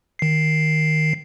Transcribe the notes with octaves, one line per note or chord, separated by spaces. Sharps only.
D#3 C7